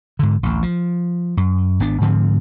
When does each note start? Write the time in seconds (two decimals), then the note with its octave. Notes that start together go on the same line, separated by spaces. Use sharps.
0.19 G#2 D3
0.43 A1 D2
0.63 F3
1.37 F#2
1.80 G#1 B3 D4
2.01 G#2 D3 F3 C4